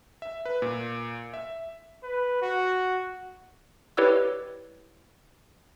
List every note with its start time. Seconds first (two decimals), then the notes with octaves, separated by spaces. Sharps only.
0.22 E5
0.45 B4
0.62 A#2
1.34 E5
2.03 B4
2.42 F#4
3.97 E4 G4 B4 C#5 D5 E6